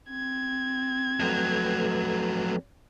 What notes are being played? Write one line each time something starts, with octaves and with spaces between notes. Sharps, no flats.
C4 G#6
F2 F#3 A3 A4 B4